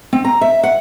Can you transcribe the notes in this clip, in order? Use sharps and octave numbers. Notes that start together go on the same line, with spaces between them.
C4
A#5
E5
F#5